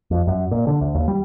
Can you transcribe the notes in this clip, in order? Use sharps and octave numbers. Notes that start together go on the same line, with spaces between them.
F2
F#2
A#2
D3
D2
D#2
G3